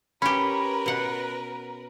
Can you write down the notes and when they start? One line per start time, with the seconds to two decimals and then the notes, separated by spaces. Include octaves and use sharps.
0.22 C#4 G4 A#4 B4 B5
0.86 B2 F#5